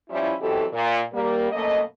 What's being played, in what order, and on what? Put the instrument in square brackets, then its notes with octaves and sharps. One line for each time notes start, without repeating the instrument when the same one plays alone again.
[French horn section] F3 G3 C#4 E4
B2 E3 F#3 C4 G4 A4
A#2
G3 A#3
F#2 B2 A3 A#3 D#5